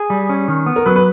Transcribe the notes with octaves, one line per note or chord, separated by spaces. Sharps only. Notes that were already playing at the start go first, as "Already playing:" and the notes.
Already playing: G#4
G3
C#4
D#3
B3
A#4
F#3 B4
B4